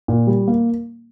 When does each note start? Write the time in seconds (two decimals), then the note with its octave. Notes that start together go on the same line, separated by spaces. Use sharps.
0.08 A#2
0.27 G3
0.48 A#3